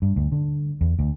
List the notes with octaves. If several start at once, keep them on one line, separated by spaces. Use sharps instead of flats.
G2
D2
D3
E2
D2